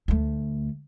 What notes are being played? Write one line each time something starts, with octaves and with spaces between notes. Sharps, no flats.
D2 A3